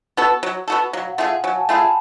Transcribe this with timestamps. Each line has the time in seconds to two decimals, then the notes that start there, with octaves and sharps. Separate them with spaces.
0.17 B3 F#4 A4
0.43 F#3
0.68 B3 F#4 A4
0.93 F#3 F5
1.05 F5
1.10 F#5
1.18 A3 F4 G#4
1.26 F5
1.36 F#5
1.44 F#3 G#5
1.54 A5
1.61 G#5
1.69 A3 F4 G#4 B5
1.78 A5